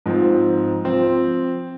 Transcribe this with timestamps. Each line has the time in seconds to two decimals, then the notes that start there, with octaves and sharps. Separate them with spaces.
0.06 G#2 F3 C4
0.85 F3 C4